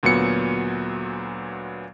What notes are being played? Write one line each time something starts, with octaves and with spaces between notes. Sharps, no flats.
D2 A#2 F#3 B3 C#7